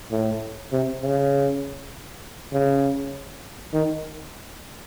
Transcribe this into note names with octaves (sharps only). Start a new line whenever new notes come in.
A2
C3
C#3
C#3
D#3